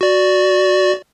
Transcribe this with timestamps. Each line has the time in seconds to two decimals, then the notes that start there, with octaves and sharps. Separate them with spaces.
0.01 F#4 D5